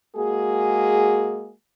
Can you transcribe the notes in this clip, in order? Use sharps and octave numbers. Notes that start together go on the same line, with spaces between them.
G#3 A#3 F#4 G#4